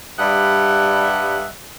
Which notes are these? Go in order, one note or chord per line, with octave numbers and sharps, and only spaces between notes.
G2 G3 D#5 E5 F#5